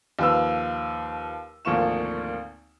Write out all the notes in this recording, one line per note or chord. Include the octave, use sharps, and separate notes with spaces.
D#2 F3 B4 F5 E6
G#1 D2 F3 A#3 C#6 E7